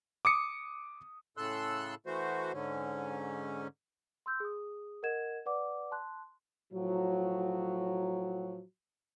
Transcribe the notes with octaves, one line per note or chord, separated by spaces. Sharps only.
D6 D#6 C#7
A2 C#3 A4 C6 E6 F#6
E3 A3 F#4 C5
G#2 D3 C#4
C6 E6 G6
G#4 D#6
A#4 D#5 F#5 G#6 E7
B4 D5 F#5 D6
A5 C6 F#6
A2 F3 F#3